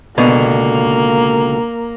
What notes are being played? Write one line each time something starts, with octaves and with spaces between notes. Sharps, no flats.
C#2 B2 D3 A#3